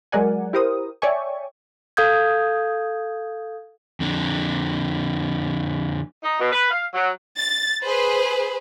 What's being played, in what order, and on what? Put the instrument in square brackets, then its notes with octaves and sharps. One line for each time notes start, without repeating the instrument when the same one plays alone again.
[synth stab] F#3 G#3 A#4 D5 F#5 G#5
E4 G4 A#4 C5 D#6
C#5 D5 E5 G5 G#5 C#6
[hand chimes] A4 F5 D#6 G6 G#6
[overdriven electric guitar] F2 D3
[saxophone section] D#4
B2
B4
F5
F#3
[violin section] A6
G#4 B4 C5